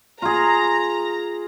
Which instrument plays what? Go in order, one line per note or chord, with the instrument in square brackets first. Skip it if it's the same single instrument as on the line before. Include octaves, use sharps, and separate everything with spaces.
[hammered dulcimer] F4 G#4 [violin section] A#5